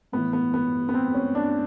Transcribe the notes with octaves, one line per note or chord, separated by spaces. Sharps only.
A2 E3 B3
B3
B3
B3
C4
C#4
D4